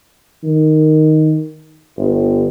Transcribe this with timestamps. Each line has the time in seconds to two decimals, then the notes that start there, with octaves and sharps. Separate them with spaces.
0.44 D#3
1.97 G1